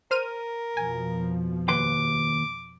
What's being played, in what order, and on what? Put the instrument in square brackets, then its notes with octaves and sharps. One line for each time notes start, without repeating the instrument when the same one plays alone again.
[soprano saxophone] A#4 [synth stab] C5 F6 D#7
[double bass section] F2 B2 F3 [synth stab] G#5
[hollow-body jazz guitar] D#2 B4 C6 [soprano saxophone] D6